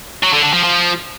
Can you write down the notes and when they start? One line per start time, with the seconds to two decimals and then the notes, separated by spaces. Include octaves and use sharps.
0.23 F#3
0.33 D3
0.43 D3
0.53 F3
0.63 F3